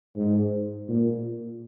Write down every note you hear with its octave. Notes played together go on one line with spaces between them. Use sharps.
G#2
A#2